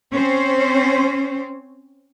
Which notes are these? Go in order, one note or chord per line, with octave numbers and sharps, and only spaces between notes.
C4 C#4 C5